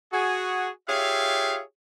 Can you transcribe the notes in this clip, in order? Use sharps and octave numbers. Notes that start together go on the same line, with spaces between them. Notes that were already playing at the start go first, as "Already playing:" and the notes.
F#4 G#4
F4 G4 G#4 C#5 E5 F5